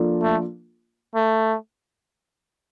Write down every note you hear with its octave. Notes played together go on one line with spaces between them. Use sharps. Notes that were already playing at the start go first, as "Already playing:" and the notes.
Already playing: F3 A#3 D4 F4 A4
A3
A3